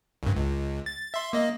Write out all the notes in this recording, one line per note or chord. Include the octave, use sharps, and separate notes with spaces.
C2 G2
C#2
A6
E5 C6
A#3 D#5